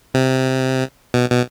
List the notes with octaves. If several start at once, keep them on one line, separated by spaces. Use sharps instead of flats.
C3
B2
B2